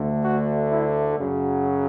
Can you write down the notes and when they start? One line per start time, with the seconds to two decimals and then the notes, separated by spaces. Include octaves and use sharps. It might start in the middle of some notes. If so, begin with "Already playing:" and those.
Already playing: D2 D3 A3
0.22 F#4
0.70 E4
1.18 F#2 C#3 F#3